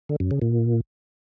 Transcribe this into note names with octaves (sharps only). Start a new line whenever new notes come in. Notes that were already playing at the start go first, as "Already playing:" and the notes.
D3
F#2
C#3
A#2